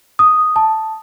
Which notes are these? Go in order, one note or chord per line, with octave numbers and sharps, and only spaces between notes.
D#6
A5